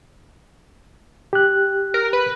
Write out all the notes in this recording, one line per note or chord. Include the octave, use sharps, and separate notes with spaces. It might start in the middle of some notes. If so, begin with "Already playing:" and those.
G4 F#6
A#4
B4